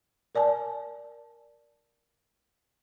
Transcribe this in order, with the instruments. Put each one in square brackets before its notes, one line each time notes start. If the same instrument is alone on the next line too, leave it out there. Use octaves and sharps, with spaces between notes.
[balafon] A#4 D5 G#5 A5